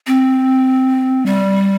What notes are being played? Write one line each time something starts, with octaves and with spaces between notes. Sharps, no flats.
C4
G3